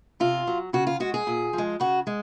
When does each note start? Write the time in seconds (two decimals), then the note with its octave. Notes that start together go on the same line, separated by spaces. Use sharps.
0.20 C3 F4
0.47 F#3
0.73 C#3 F#4
0.87 F4
1.00 G#3 F#4
1.14 G#4
1.27 A#2
1.53 F3
1.58 G#3
1.80 C#3 F#4
2.07 G#3